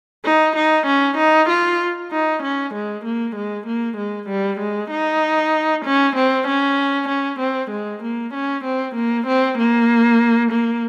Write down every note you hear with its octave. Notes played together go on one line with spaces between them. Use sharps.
D#4
D#4
C#4
D#4
F4
D#4
C#4
G#3
A#3
G#3
A#3
G#3
G3
G#3
D#4
C#4
C4
C#4
C#4
C4
G#3
A#3
C#4
C4
A#3
C4
A#3
A#3